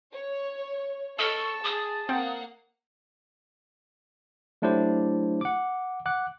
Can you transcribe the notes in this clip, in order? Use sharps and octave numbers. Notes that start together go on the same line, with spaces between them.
C#5
A4 D#5 A5 C#6 E6 F6 E7
G#4 D#6
A#3 C4 F5 F#5
F#3 A3 D4 E4 G4 C5
F#5 D6
F#5 D6 F#6